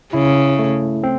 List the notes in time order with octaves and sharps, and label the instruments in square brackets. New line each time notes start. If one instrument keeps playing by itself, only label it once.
[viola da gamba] C#3 [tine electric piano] E4
[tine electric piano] A3
C4